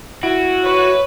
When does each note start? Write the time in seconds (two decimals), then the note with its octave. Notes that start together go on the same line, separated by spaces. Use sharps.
0.23 E4 F#4 D7
0.63 B4 C#5